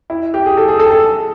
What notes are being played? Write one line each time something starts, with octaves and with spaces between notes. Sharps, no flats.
E4
G4
G#4
A4
G#4
A4
A4